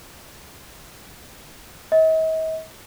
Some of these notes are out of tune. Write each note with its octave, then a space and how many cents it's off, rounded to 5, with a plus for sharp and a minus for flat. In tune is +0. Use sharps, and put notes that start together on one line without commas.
D#5 +45